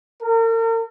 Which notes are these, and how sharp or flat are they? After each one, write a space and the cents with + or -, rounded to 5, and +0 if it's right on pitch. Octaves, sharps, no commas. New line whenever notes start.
A#4 -40